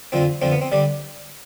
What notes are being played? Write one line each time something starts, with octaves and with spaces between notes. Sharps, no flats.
F2 D3 F3 C4
F2 D3 F3 C4
B3
C4
D3 G3 D4